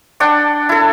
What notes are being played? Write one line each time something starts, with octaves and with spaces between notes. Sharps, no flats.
D4 D5 F#5 G5
E4 A4